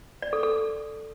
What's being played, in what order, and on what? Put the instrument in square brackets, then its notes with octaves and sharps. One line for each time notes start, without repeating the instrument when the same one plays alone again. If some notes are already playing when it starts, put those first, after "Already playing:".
[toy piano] D5
A4
A4